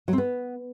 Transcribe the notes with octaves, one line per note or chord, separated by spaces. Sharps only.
F#3
C4
B3